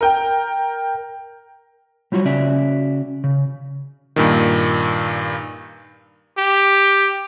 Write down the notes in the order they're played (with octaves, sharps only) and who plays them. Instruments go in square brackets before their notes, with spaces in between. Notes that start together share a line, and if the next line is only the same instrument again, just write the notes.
[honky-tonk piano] A#4 G5
[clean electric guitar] F#3 G3 F4 F#4 C#5
C#3 C#4 F#4 D5 E5
C#3
[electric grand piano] G2 A#2 D#3
[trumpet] G4